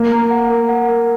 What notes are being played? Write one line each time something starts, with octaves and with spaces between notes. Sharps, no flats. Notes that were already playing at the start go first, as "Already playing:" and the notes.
Already playing: A#3 A#4
A#5
F#5
A#4
F#5
A#4